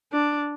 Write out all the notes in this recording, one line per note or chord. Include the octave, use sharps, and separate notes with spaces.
D4